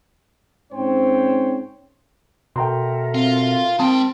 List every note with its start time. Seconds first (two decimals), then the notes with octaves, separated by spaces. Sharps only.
0.73 G#2 C4 C#4 C5 C#5 G5
2.56 B2 A4 A#4 E5 G5 A#5 C6
3.15 C4 F4
3.80 G#3 C4 A#4 G5 A5 C6